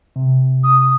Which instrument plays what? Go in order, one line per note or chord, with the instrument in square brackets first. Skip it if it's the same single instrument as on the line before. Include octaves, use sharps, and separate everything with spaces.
[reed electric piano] C3
[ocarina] D#6